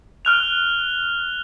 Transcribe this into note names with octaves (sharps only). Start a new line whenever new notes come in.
F6 F#6 F7